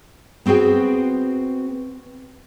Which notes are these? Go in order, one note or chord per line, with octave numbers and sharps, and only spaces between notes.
B3 C4 F#4 G#4 G5